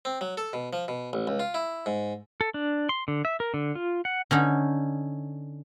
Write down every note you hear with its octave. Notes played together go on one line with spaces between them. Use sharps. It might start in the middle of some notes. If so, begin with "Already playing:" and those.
C4
F#3
A4
B2
F3
B2
A1
C#2
F4
E4
G#2
A4
D4
C6
D3
E5
A#4
D3
F4
F#5
D3 C#4 D#4